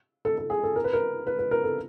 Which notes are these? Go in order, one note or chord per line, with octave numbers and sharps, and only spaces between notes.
A4
A4
G#4
A4
A#4
B4
A#4
B4
B4
A#4
A4